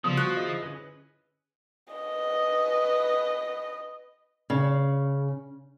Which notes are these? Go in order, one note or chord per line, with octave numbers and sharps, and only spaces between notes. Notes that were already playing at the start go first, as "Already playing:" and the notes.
C#3 F3 G3 B3 A4 D#6
F#4 C#6 F#6
D3 E4 G#4 D#5
C#4 G#4 B4
B4 D#5
C#3